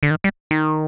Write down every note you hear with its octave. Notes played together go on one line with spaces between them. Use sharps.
D3
D#3
G3
D#3